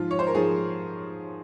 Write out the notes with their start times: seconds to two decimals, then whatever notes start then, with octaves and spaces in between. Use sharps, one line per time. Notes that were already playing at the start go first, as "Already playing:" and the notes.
Already playing: G#2 F3 F4
0.11 C#5
0.19 C5
0.27 A#4
0.34 G#2 F3 G#4